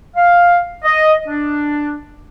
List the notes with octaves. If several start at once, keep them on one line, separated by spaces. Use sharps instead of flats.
F5
D#5
D4